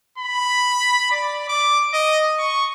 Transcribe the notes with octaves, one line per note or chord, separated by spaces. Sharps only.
B5
D5
D6
D#5
C#6